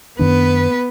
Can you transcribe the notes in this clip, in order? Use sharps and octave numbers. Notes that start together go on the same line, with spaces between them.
F#2 D#3 B3 D4 B4